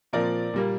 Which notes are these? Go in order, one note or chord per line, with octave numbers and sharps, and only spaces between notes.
A#2 F3 C4 A#4 D5
A#2 G3 A#3